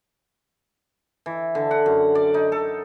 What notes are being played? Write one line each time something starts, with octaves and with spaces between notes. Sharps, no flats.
E3
D3
F#5
F#2
D5
D#4
A4